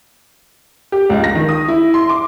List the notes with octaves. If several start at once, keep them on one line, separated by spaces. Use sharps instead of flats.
G4
C#2
A#6
D#3
D#6
E4
C6
D6